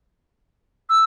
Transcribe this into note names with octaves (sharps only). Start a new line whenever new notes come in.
E6